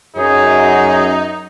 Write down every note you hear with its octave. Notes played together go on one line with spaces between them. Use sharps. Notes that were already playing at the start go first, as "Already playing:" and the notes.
F#2 D#4 G#4 C#5